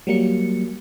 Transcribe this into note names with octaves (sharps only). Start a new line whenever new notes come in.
F#3 G3 A#3 C#7